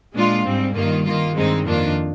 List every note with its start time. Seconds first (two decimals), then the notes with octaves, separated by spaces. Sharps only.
0.14 A#2 G#3 D4 F4
0.45 G#2 G3 C4
0.74 G2 D#3 A#3 F4
1.04 D#3 A#3 F4
1.35 G2 D#3 G#3 C4 D#4
1.65 F2 D#3 A#3 D4 F4